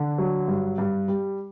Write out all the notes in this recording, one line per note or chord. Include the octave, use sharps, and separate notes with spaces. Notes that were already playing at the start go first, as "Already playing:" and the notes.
Already playing: D3
F#3
G2
G2
G3